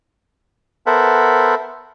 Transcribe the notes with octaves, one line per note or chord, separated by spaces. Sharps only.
B3 A4 A#4 C5 E5 F#5